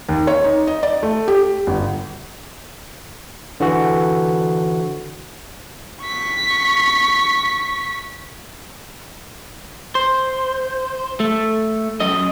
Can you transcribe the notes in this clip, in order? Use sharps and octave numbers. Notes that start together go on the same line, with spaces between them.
D#2
C#5
D#4
D#5
D5
A3
G4
G1
D3 E3 F#4
C#6 B6
C5
A3
F#2 D#5